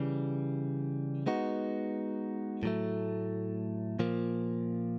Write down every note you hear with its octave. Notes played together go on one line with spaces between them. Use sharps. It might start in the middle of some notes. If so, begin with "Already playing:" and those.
Already playing: C#3 E3 G3
G#3 B3 D#4 F#4
A2 F#3 A3
A#2 F3 A#3